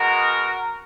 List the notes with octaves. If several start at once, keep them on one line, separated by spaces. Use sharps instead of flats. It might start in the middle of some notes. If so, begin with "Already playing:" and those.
Already playing: B2 G#3 B3 F#4 A#4